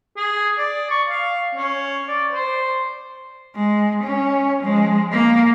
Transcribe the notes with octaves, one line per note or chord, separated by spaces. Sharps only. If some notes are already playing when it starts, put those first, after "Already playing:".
G#4
D5
C#6
F5
C#4
D5
C5
G#3
C#4
F3 G#3
A#3